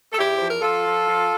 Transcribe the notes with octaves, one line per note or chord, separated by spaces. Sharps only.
A4
E2 E4 G4
F3 C5
A#4
F3 F4 A4
F3
F3